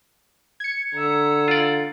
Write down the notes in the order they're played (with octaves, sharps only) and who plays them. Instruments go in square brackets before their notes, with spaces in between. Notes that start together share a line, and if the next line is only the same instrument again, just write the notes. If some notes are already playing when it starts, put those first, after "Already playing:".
[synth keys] G#6 C#7
[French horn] D3 [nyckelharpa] E5 A#5
[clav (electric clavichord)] F4 D5